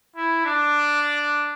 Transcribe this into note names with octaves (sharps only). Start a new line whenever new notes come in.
E4
D4